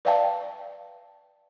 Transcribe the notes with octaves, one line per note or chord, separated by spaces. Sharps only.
B4 D5 E5 F5 G5 A5